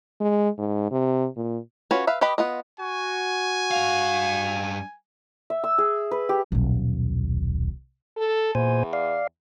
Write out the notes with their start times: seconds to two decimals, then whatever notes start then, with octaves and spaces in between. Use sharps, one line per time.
0.21 G#3
0.58 G#2
0.91 C3
1.37 A#2
1.91 C#4 F4 F#4 B4 C#5
2.07 B4 E5 F5
2.21 G4 B4 D#5 B5
2.38 B3 F4 D#5
2.80 F#4 G#5
3.71 G2 F5
5.50 E5
5.64 E6
5.78 G#4
6.11 B4
6.29 G4
6.52 D#1 B1
8.17 A4
8.55 E2 A#2 C5 G#5
8.93 D5 F5